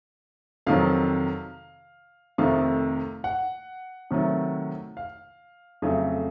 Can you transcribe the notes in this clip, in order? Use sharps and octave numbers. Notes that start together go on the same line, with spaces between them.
F2 C3 D#3 F#3 F5
F2 C3 D#3 A3 F5
F#5
C3 D#3 F#3 A3
F5
F2 C#3 F#3 A3